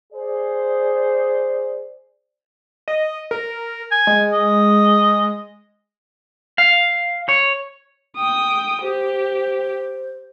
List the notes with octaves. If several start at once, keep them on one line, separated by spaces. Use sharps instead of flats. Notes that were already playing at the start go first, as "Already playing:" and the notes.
G#4 C5 D5
D#5
A#4
G#5
G#3
D#5
F5
C#5
G5 D#6
G4 C5